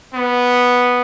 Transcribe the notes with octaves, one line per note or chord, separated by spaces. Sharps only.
B3